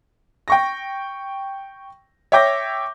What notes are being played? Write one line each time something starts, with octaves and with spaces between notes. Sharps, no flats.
G5 C#6 A#6
C#5 E5 G5 D6 G6 A#6